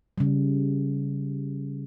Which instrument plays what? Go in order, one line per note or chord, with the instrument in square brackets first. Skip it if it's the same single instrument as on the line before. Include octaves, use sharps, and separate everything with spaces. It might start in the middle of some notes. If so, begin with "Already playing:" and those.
[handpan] C#3 G3